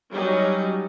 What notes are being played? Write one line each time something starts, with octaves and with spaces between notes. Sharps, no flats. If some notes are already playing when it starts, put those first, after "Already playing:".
F#3 G3 C#4 D#4